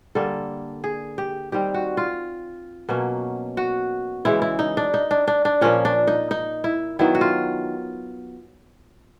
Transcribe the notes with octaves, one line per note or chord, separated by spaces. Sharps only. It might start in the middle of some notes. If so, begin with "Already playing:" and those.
D3 G3 A#3 A4
G#4
G4
D#3 G3 C4 G4
F#4
F4
B2 F#3 A#3 C#4
F#4
C#3 E3 G#3 E4
E4
D#4
D4
D#4
D4
D4
D4
A#2 F3 A#3 C#4
D4
D#4
D#4
E4
D#3 F#3 B3 E4
F#4
F4